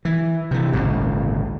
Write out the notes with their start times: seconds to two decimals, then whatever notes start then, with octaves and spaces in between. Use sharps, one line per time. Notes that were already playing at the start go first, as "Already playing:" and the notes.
0.05 E3
0.51 C3 E3
0.73 G#1 C#2 A#2 D3